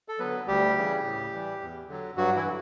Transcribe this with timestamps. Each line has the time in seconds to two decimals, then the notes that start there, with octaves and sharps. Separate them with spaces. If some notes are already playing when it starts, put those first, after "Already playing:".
0.08 A4
0.19 D3 F#3 B3 B4
0.47 D2 G3 G4
0.76 C#3 E3 G3
1.04 A2
1.32 E3 G3
1.61 E2
1.89 D3 F#3
2.17 G2 F#3 F#4
2.36 E3 E4
2.45 D3